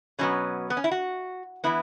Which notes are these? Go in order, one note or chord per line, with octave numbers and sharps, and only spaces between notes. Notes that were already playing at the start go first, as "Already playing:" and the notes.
B2 F#3 B3 C#4
B3
C#4
E4
F#4
E3 B3 E4